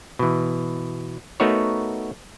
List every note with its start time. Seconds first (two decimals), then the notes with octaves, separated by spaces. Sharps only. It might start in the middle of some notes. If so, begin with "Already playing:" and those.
0.19 B2 E3
1.40 A3 B3 D#4 F#4 A#4 C#5